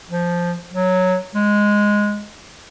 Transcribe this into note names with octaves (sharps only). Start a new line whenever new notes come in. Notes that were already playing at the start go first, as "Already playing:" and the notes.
F3
F#3
G#3